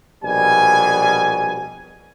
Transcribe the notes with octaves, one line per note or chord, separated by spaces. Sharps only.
A#1 B2 G3 G#5